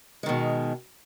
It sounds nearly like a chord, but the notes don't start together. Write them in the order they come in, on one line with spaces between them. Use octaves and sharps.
G#3 D#3 B2